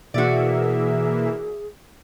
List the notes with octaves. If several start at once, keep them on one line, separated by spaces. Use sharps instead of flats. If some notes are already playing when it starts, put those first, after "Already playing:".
B2 E3 A#3 F#4 G#4 D5 E5